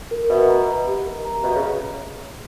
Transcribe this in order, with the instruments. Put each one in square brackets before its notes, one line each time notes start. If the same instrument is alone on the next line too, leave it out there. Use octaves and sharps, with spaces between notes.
[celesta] A#4
[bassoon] B2 [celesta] E5
[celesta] A#5
D#5
G4
A#4
A#5
[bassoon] B2 [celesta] E5
[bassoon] C#3